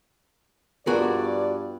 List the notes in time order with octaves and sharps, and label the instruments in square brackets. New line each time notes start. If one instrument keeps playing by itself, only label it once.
[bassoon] G2 [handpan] B3 F4 [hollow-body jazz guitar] F#4 G#4 A#4 [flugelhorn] D5